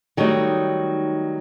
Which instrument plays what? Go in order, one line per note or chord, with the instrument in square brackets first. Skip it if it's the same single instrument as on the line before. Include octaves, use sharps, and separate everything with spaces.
[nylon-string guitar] D#3 F#3 G3 A3 D#4